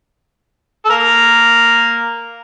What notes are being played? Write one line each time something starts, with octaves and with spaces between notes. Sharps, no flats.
A4
A#3 A#4